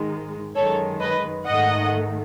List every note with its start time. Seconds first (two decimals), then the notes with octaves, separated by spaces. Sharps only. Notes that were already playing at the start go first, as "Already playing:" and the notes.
Already playing: G#2 D#3 G#3
0.55 F#2 D#3 G#3 A4 C#5
1.00 B4 D#5
1.46 G#2 D#3 A3 D#5 F#5